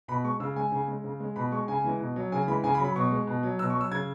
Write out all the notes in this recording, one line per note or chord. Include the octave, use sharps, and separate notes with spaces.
B2 B5
G#3 C#6
C#3 E6
G#3 G#5
C#3
G#3
C#3
G#3
B2 B5
G#3 C#6
C#3 G#5
E3 G#3
B2
F#3
C#3 G#5
E3 G#3 B5
C#3 G#5
B5
F#3
B5
B2 C#6
G#3
B2
F#3
B2 E6
C#6
F#3
E6
C#3 G#6